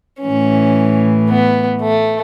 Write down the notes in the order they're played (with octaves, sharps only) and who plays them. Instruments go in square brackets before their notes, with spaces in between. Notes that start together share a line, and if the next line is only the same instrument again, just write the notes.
[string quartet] A2 E3 C#4
B3
A3